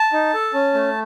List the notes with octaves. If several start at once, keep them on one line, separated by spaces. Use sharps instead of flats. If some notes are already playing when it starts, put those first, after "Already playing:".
Already playing: A5
D#4
A4
C#4
A3